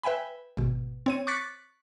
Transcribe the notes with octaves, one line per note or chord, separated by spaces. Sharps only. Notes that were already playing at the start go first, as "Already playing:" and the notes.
B4 E5 G5 G#5 B5
G#1 B2
C4 C#5 D#7
C#6 D6 F#6 A6 B6 C#7